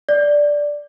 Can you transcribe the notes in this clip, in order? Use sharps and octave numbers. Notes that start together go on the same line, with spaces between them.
D5